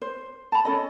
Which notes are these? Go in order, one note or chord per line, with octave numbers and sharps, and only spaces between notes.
C5
A5 B5
C#4 A4 D#5